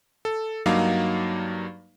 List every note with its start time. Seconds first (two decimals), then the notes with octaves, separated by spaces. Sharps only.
0.25 A4
0.66 G2 F#3 A#3 D#4 F5 D6